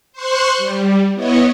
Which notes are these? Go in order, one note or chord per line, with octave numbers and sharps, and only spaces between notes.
C5 C6 C#6 F#6
G3
B3 E4 C#5 D#5